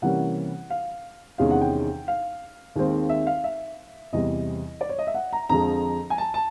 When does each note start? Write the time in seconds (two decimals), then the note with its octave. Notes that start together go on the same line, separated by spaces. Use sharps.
0.02 C3 E3 G3 A#3 C#4 F#5
0.70 F5
1.38 E2 C3 D#3 G#3 C#4 F5
1.51 F#5
1.61 G5
2.08 F5
2.76 D#2 D#3 G#3 C4
3.09 E5
3.27 F5
3.44 E5
4.13 E2 C3 E3 G3 D#5
4.81 D5
4.89 C#5
4.99 D#5
5.07 E5
5.14 F#5
5.33 A#5
5.49 F2 D3 F3 G#3 A#5
6.10 G#5
6.18 A5
6.34 A5